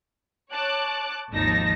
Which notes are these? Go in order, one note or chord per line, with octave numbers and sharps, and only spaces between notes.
C#5 A5 D6 F#6
G#1 D#2 F3 D#4 A5 A#6